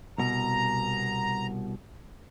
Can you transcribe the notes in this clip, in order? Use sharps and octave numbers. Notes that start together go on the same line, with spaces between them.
C2 B2 A#5